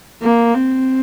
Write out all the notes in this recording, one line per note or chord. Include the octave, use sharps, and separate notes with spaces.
A#3
C4